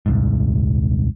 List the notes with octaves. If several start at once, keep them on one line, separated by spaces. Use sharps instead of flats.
D#1 C2 G#2